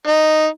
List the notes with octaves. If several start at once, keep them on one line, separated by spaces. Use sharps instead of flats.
D#4